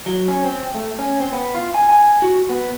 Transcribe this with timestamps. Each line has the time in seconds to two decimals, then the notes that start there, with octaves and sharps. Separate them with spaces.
0.06 F#3
0.28 C#4
0.44 C4
0.75 A3
0.99 C#4
1.20 C4
1.33 B3
1.54 F4
1.74 G#5
1.90 G#5
2.22 F#4
2.49 B3